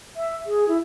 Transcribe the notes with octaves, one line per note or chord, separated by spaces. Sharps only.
E5
G#4
E4